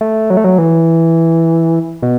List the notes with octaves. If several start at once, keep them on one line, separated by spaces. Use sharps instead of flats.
A3
F#3
A3
F#3
E3
B2